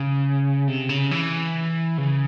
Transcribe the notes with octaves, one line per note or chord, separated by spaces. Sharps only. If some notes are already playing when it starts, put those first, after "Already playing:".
Already playing: C#3
C3
C#3
E3
C#3